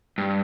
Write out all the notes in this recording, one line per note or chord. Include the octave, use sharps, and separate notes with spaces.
G2